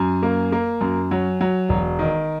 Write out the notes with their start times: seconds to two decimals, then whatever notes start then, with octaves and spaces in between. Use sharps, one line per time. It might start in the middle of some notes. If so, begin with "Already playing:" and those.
Already playing: F#2 G#5
0.23 A#3
0.52 A#3
0.81 F#2
1.11 F#3
1.41 F#3
1.69 E1
1.99 D#3